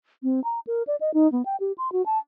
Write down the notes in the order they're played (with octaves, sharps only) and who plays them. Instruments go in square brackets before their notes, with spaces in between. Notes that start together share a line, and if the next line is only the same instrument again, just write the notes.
[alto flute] C4
A#5
A#4
D5
D#5
D#4
B3
G5
G4
C6
F#4
A5